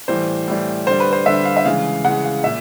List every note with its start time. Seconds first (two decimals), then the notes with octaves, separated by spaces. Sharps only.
0.08 A2 E3 G3 C5
0.48 A2 E3 G3
0.86 D3 G3 C5
1.00 B4
1.13 C5
1.26 D3 G3 E5
1.45 F5
1.57 E5
1.65 C#3 E3 G#3 F5
2.04 C#3 E3 G#3 F#5
2.24 F5
2.44 A#2 E5